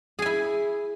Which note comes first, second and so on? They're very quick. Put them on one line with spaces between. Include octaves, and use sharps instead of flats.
G#4 G#5 E4